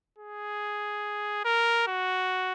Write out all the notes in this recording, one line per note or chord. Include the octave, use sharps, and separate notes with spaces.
G#4
A#4
F#4